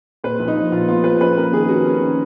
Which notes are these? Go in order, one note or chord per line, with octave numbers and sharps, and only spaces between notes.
A#2 B4
A#1
D#4
F3
A#2 F4
B3 F4
F3 B4
C#4 B4
A#3 A#4
D#3 G#4
C#4 F#4
C#4
D#3